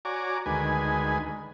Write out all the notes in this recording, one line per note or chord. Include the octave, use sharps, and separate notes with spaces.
F#4 C#5 D5 G#5 A#5 D6
D2 D#3 G#3 B4 G#5